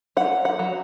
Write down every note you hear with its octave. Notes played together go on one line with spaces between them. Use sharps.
F#3 F#5
F#5
F#3